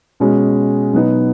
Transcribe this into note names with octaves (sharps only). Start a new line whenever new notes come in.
B2 G#3 C#4
B2 F#3 B3 D#4